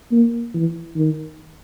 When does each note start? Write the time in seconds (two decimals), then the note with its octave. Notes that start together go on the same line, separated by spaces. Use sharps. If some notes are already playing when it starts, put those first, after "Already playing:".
0.12 A#3
0.54 E3
0.96 D#3